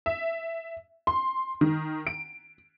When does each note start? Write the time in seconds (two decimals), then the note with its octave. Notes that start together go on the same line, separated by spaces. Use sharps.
0.06 E5
1.07 C6
1.61 D#3
2.07 D7